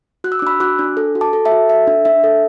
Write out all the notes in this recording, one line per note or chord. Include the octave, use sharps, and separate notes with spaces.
F#4 F#6
E6
D6
D4 B5 E6
F#4 D6 F#6
D4
A4
F#4
A5 D6
A4
E5 A5
F#4
A4 E5
D4
D4 E5
A4